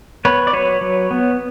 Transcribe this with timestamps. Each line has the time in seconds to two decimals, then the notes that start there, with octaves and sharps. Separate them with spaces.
0.25 B3 B4 C#5
0.47 D5
0.53 F#3 B4 C#5
0.81 F#3
1.11 B3